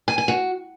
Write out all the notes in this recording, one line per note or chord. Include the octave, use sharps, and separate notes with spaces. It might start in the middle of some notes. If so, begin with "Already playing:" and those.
G#5
G#5
F#4